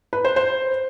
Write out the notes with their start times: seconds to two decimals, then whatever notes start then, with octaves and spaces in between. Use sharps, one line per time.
0.13 B4
0.25 C5
0.36 C5